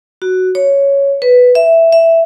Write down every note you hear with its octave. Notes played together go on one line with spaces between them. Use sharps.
F#4
C#5
B4
E5
E5